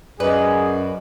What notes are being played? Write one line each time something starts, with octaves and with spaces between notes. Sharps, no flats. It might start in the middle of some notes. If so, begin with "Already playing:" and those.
F#2 G#4 B4 D5 D#5